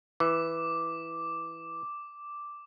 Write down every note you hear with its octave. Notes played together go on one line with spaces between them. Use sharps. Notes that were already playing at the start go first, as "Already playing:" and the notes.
E3 D6